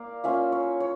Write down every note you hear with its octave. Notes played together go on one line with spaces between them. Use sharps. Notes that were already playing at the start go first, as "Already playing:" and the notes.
Already playing: A#3 D5 F5
A#3 C#4 F4 E5
C#5
C#5